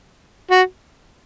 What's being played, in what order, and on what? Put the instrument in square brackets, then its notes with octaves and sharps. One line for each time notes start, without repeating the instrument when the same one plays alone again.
[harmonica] F#4